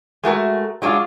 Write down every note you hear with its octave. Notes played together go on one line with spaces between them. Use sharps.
G#3 A3 F#4 A#4
F#3 G#3 D4 E4 F4